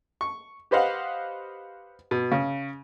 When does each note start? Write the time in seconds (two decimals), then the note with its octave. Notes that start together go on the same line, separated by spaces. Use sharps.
0.21 C#6
0.71 G4 B4 C5 D#5 F5 F#5
2.11 B2
2.32 C#3